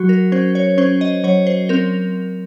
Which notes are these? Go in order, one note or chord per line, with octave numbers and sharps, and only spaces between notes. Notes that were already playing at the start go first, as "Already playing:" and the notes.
Already playing: F#3 F#4
A#4
C#4 C5
C#5
C#4 C5
D#5
F#3 C#5
C5
C4 A#4